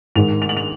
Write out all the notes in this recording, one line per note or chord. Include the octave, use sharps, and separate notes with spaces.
G#2 D#3 G#3 F7
F7
F#7
F7